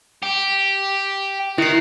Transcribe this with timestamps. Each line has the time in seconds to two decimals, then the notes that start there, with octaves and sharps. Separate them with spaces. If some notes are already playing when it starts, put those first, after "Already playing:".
0.23 G4
1.58 D#3 E4 C7